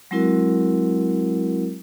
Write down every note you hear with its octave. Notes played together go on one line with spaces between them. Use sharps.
F#3 G#3 C4 E4 F#4 A#4